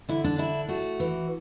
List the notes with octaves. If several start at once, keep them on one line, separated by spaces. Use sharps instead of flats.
D3 E4
D4
D4 E4
A3 F#4
E3